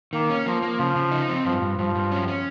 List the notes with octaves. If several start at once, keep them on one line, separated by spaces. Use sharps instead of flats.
D#3 A#3
C#4
F3 A#3
A#3
C#3 F3
C#3
D#4
C4
G2 F3
G2
G2 F3
G2
C#4
C#4